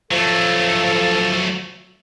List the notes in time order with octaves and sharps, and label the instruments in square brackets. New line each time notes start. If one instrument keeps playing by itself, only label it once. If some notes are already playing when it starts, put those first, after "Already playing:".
[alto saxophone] F3 [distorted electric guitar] F#3 A3 [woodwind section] A4